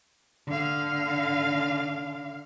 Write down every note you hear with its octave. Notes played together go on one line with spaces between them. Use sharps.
D3 F5